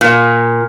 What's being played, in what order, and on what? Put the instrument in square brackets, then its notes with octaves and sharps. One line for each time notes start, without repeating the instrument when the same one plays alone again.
[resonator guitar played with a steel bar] A#2